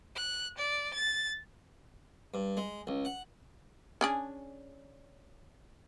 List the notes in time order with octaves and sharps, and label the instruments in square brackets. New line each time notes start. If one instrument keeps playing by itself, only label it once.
[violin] F#6
D5
A6
[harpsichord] G2
G#3
C#2
F#5
[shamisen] C#4 D4 G#4